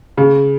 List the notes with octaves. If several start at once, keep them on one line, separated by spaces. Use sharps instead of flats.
C#3